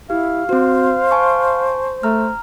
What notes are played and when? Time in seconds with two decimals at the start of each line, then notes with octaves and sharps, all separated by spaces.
0.10 E4 G4 F5
0.49 C4 F#4 C5
1.11 G#5 A5 C#6
2.03 A3 A#5 F6